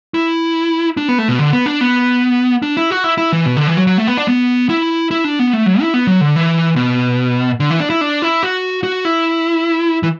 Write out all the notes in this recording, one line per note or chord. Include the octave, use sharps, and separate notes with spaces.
E4
D4
B3
A3
B2
D3
B3
D4
B3
D4
E4
F#4
E4
E4
E3
B2
D3
E3
F#3
F#3
A3
B3
D4
B3
E4
E4
D4
B3
A3
F#3
E4
B3
F#3
D3
E3
B2
D3
E3
D4
E4
D4
E4
F#4
F#4
E4
E3